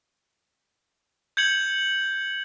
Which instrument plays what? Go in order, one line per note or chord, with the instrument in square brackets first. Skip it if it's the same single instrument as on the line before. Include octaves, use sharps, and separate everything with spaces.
[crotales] G6 G#6 C#7 F#7